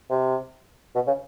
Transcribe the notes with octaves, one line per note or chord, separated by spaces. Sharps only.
C3
B2
C#3